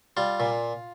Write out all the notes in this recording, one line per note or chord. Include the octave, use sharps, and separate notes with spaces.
G3 F4
A#2